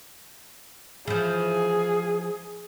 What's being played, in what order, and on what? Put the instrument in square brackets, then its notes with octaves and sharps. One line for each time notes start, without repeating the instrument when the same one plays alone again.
[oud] E3 F3 [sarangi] G#4